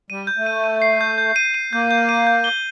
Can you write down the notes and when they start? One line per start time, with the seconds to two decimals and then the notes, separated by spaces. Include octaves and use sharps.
0.10 G3 D#7
0.27 G6
0.37 A3
0.46 D#7
0.64 D#7
0.82 C7
1.01 G6
1.18 G6
1.36 D#7
1.54 D#7
1.73 A#3 G6
1.91 G6
2.09 D#7
2.27 G6
2.44 G7